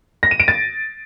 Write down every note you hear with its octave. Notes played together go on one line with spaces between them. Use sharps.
A#6
D#7
D7
A6